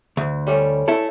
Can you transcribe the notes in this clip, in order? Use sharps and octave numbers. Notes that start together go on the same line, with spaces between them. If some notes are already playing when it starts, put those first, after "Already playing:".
D2
G3 A3 C#4
A3 E4 A4